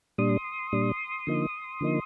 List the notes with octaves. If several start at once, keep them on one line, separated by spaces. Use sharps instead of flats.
A#2 G3 D4 C6 D#6
A#2 G3 D4
D3 F3 A#3 D#4
D3 F3 A#3 D#4